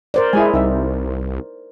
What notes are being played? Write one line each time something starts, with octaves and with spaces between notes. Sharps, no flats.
A#4 C5 D5
G#3 E4 G#4 G#5
C2 D#4 E5